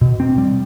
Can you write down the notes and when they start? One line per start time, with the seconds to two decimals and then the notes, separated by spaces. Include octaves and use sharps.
0.01 B2
0.20 C4
0.38 G3